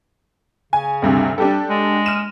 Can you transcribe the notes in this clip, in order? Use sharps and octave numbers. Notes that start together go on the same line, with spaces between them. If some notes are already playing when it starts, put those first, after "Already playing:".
C#3 G#5
D2 G2 C3
G3 D4 G4 A4
G#3
F6 D#7 E7